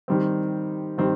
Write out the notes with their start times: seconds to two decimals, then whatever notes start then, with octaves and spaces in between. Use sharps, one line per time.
0.08 D#3 G3 C4
0.98 D#3 G3 C4